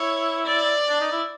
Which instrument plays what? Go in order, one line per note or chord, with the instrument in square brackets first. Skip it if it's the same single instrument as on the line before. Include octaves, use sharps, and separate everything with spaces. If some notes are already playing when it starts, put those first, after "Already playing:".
Already playing: [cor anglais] E4 [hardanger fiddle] C#5
[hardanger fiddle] D5
[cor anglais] D4
D#4
E4